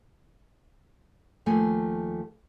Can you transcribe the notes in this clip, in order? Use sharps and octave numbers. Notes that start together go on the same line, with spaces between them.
D#2 F3 A3 G#5